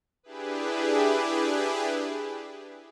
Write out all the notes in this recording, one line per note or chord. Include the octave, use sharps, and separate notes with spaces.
D4 E4 G4 G#4 B4